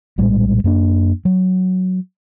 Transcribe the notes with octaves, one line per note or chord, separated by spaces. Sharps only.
A#1 A2 G3 G#3
F#2 A#3 D4
F#3